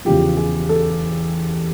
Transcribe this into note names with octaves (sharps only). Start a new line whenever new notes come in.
E2 C#3 F3 G4
G#4
A4